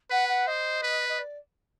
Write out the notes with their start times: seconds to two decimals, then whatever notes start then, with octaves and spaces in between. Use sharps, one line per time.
0.10 B4 F#5
0.28 F#5
0.47 C5 D#5
0.82 B4
1.08 D#5
1.18 D5